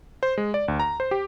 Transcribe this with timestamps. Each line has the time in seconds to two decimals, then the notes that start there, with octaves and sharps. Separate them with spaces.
0.23 C5
0.38 G#3
0.54 D5
0.68 D2
0.80 A#5
1.00 C5
1.11 G4